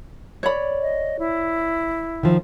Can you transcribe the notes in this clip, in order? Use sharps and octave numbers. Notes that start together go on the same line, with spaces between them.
C#5 D5 B5
D#5
E4
D#3 F3